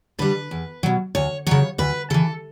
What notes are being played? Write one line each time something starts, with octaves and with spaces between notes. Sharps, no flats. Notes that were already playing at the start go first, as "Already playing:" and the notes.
D3 G3 B4
E2
B2 F#3
D2 C#5
C#3 F#3 C#5
D2 B4
C#3 E3 A4